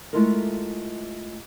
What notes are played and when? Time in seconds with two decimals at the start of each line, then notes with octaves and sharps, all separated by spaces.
0.13 G#3 A3 E4 F4 A4 A#4